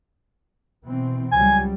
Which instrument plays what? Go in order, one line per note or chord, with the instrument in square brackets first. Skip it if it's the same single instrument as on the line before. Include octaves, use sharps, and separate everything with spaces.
[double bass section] B2 E3 C4
[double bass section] C#2 F#3 G3 [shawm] G#5